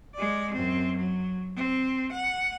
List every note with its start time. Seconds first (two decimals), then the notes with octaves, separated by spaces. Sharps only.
0.14 G#3 D5
0.53 F#2 C4
0.96 F#3
1.56 C4
2.11 F#5